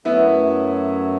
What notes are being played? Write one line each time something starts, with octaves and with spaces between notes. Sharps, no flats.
F#2 F#3 A3 B3 E4